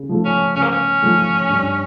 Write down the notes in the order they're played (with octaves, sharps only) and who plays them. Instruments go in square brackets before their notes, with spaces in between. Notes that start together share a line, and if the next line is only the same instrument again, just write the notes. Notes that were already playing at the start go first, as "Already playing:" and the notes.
Already playing: [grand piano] C#3
F3 A3
[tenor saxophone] C#4
[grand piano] C#3 [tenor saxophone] C#4
[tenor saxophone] A#3
C#4
[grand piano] F3 A3
G2